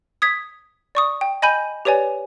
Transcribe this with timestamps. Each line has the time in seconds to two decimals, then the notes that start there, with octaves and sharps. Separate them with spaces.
0.22 D#6 G#6 B6
0.95 D5 C#6 D#6
1.21 G5
1.42 D#5 G#5 B5 G6 D#7
1.85 G4 B4 C#5 D5 G#5